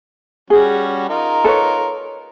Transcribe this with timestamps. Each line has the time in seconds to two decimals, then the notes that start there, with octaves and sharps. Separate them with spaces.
0.50 G3 C#4 F#4 G#4
1.09 D#4 F4 A#4
1.44 A4 B4 C#5